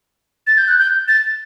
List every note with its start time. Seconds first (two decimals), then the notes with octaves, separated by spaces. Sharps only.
0.47 A6
0.58 G6
0.68 F#6
0.78 G6
1.08 A6